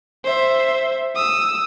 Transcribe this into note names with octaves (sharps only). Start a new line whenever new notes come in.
C5 E5
D#6 E6